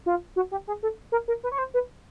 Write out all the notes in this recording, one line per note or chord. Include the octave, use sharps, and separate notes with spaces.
F4
F#4
G4
G#4
A4
A#4
A#4
B4
C#5
C5
B4